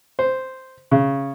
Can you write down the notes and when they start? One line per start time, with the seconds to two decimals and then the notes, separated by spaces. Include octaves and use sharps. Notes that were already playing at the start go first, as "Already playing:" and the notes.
0.19 C5
0.91 C#3